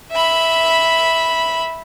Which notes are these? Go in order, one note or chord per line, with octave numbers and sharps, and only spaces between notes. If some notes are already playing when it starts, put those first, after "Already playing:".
E5 B5